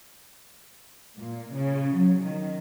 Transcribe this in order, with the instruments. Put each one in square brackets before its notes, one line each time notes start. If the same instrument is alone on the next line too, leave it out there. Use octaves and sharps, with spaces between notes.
[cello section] A#2
C#3
F#3
D#3